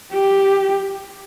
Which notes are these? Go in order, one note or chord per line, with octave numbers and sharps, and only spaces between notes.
G4